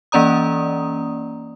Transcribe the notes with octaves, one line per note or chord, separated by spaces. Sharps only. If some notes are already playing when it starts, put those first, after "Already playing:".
E3 A#3 C#4 D5 A#5 D#6